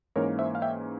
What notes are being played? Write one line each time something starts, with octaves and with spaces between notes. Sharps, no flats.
G#2 E3 A#3 C#4 A#4 C#5
C5 E5
F5
E5 G5